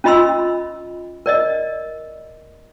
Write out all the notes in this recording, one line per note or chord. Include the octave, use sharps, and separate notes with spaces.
C#4 F4 D#5 B5 C6 E6
A#4 D5 D#5